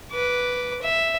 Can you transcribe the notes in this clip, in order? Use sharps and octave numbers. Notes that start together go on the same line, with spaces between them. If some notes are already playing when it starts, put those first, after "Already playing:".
B4 D6
E5